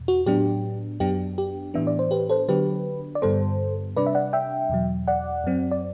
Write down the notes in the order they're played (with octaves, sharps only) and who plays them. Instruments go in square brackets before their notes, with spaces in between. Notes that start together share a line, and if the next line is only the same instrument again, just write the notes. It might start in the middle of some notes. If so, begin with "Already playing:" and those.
Already playing: [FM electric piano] E2 B2
F#4
A2 F#3 B3 D4 G4
F#2 F#3 B3 D4 G4
G4
A2 E3 B3 D4 E5
D5
C5
G4 B4
A4 C5
D3 F#3 B3 D4 G4 B4
D5
G2 D3 G3 B3 A4 C5
C3 G3 D4 B4 D5
E5
D5 F#5
E5 G5
E2 B2 F#3
D5 F#5
F#2 F#3 C4
D5